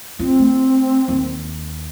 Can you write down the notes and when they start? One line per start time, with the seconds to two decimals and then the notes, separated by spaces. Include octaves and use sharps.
0.19 C4 F4
0.39 A3
1.08 D#2